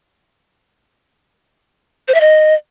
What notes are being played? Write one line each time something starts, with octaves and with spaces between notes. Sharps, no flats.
C5
E5
D#5